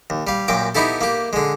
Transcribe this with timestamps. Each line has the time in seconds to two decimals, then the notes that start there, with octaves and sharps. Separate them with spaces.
0.10 D#2
0.27 G3 F5
0.48 F#2 A#2 G5 D6
0.75 B3 D#4 E4 G4 A4
1.01 A#3 G4
1.33 D3 G#3